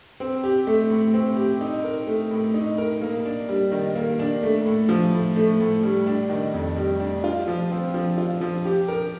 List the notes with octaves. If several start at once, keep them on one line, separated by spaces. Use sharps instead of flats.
C4
G4
A3
A2
C4
G4
D#4
A#4
A3
A2
D#4
A#4
A#3
D4
G3
D#3
A#3
D4
A3
A2
F3
A2
A3
A2
G3
D4
D#3
F2
G3
D4
F4
F3
C4
F3
F4
F3
G4
A#4